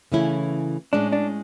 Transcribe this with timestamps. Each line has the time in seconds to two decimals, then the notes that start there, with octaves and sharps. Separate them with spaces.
0.12 C#3 E3 A3 C#4 E4
0.93 A2 G#3 C#4 D4
1.12 D4